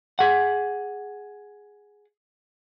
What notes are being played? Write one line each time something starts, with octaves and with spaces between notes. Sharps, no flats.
G#4 F#5